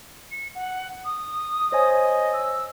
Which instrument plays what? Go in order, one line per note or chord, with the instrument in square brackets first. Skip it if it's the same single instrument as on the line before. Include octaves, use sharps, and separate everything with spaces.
[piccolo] C#7
F#5
D#6
[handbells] C5 C#5 G#5 [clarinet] D#5
[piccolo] E6